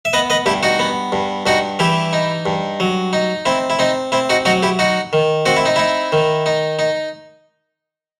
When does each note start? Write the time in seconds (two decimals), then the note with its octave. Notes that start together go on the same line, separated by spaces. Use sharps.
0.05 E5
0.13 B3 B4 D#5
0.30 B4 D#5
0.46 G2 E4 G4
0.63 D#4 F#4
0.79 B3
1.12 G2
1.46 G2 D#4 F#4
1.79 E3 E4 G4
2.13 D#4
2.46 G2
2.80 F#3
3.13 D#4
3.46 C4 E4
3.70 E4
3.79 C4 D#4
4.12 C4 E4
4.30 D#4 F#4
4.45 F#3 D#4 F#4
4.63 E4 G4
4.79 D#4 F#4
5.13 D#3
5.46 C4 F#4
5.56 E4
5.66 D#4
5.76 D#4 E4
6.12 D#3
6.46 D#4
6.79 D#4